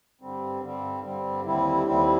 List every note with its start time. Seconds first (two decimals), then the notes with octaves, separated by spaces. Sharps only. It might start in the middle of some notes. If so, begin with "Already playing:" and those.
0.21 G2 D3 G3 C4
0.63 G2 D3 G3 C4
1.04 G2 D3 G3 C4
1.45 D#2 D3 G3 C4 E4
1.86 D#2 D3 G3 C4 E4